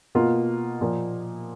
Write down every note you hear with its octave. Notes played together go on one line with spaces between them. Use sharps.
B2 A#3 F4
A#2 F3 A#3